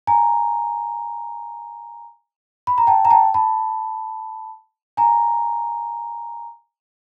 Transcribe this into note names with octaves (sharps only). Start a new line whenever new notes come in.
G#5 A#5
B5
A#5
G5 A5
A#5
G5 A5
A5 B5
G#5 A#5